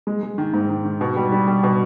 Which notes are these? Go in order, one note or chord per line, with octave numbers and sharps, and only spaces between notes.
G#3
G#3
D#3
G#2
D#3
D#3
B2
G3
G3
G3
B2